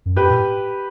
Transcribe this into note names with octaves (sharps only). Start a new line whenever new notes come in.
F#2
G2 G4 B4
A2